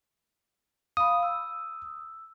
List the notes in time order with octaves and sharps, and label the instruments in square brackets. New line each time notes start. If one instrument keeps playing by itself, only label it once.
[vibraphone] F5 B5 [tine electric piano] D#6
[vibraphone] E6